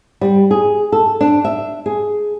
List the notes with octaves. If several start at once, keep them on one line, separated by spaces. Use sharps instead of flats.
G3
G#4
A4
D4
E5
G#4